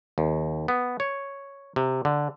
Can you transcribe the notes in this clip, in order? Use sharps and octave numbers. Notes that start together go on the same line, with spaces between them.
D#2
B3
C#5
C3
D3